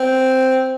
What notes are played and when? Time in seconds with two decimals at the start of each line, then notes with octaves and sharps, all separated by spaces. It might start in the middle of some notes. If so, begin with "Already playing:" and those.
Already playing: C4